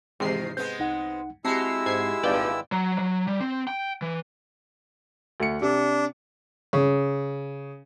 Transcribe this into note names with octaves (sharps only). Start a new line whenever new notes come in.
E2 G#2 C3 D#3 C7
G#3 B3 C4 G6
C2 D#4 F#5
G#3 C4 E4 F#4 G4 A5 E6 C7
G#2 G#6 C7
G#1 G2 A#2 B4 D5 F5 G5
F#3
F#3
G3
C4
G5
E3
D2 C#7
C3 D4
C#3